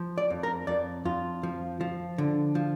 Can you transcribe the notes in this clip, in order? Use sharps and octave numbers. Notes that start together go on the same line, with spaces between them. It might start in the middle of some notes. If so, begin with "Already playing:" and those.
Already playing: F3
D5
F2
A#4
F2 D5
F2 F4
F3
F3
D3
F3